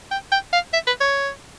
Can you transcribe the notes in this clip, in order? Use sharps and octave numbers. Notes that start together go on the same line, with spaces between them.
G5
G5
F5
E5
B4
C#5